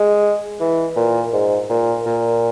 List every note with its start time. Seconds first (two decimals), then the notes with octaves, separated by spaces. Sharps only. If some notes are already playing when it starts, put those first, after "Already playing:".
Already playing: G#3
0.60 E3
0.96 A#2
1.33 G#2
1.69 A#2
2.06 A#2